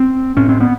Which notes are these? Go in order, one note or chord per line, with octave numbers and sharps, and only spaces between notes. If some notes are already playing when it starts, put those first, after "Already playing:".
Already playing: C4
A2 C#4
C4
B3